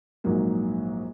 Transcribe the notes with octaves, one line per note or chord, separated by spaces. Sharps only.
A#1 G#2 F#3 A#3